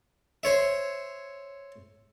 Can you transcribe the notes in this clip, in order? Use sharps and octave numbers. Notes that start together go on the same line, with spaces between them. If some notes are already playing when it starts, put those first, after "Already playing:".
C5 C#5 E5